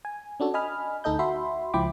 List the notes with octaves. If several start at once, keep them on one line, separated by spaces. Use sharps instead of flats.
G#5
C#4 D4 F#4 A4
D#5 G#5 B5 F6
D2 D#4 A4 D#5 G6
F#4 E5 B5 C6
C#2 F3 E4 G5 B5 D6